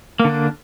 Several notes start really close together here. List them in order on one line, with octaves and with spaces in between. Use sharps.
A#3 D3 D4